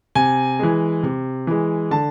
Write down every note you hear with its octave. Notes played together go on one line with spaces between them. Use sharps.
C3 G#5
E3 G#3
C3
E3 G#3
D3 A5